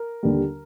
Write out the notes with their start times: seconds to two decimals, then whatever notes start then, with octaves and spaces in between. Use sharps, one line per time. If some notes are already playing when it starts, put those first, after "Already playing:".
Already playing: A#4
0.23 D#2 D3 G3